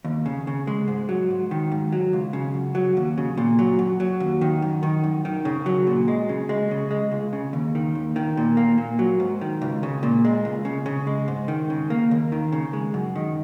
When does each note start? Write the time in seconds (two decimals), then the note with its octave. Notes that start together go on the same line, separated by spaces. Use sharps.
0.05 D#2
0.26 C#3
0.47 C#3
0.67 G#3
0.88 G#2
1.09 F#3
1.30 G#2
1.51 D#3
1.72 G#2
1.93 F#3
2.13 C#2
2.33 C#3
2.54 F#2
2.75 F#3
2.97 D#2
3.18 C#3
3.38 A#2
3.59 F#3
3.79 F#2
4.00 F#3
4.20 D#2
4.41 D#3
4.62 F#2
4.83 D#3
5.04 F#2
5.25 D#3
5.45 C#3
5.66 F#3
5.87 A#2
6.08 G#3
6.29 C#3
6.49 G#3
6.71 C#3
6.91 G#3
7.12 C#2
7.33 C#3
7.53 D#2
7.75 D#3
7.95 D#2
8.16 D#3
8.37 A#2
8.57 A#3
8.78 A#2
8.99 F#3
9.20 G#2
9.41 D#3
9.62 C#2
9.83 C#3
10.03 A#2
10.25 G#3
10.45 C#2
10.65 C#3
10.86 C#3
11.07 G#3
11.28 G#2
11.48 D#3
11.70 C#3
11.90 A#3
12.11 D#2
12.32 D#3
12.53 C#3
12.73 G#3
12.94 F#2
13.16 D#3